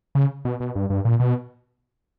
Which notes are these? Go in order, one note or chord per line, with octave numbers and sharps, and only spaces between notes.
C#3
B2
B2
G2
G2
A#2
B2